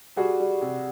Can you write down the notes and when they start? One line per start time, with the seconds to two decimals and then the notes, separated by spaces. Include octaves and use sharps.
0.16 G3 F#4 G#4
0.39 G3
0.61 C3